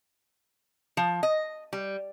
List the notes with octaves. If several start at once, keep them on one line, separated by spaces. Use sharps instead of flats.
F3
D#5
G3